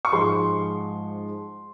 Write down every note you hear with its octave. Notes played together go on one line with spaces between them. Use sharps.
C#6
G#2 F3 G#3 C6